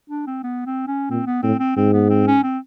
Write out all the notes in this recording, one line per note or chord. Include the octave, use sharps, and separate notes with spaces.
D4
C4
B3
C4
C#4
A#2 C4
B3
A2 C4
C4
G#2 C4
B3
C4
C#4
C4